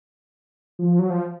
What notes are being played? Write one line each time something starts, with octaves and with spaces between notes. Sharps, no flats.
F3
F#3
F3